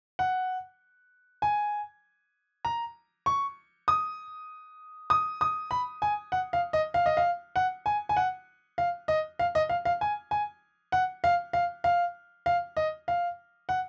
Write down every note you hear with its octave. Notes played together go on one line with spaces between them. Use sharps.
F#5
G#5
A#5
C#6
D#6
D#6
D#6
B5
G#5
F#5
F5
D#5
F5
D#5
F5
F#5
G#5
G#5
F#5
F5
D#5
F5
D#5
F5
F5
G#5
G#5
F#5
F5
F5
F5
F5
D#5
F5
F#5